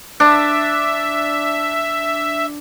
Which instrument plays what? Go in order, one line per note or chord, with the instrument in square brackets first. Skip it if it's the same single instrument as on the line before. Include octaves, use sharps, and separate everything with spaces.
[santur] D4 [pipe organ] E5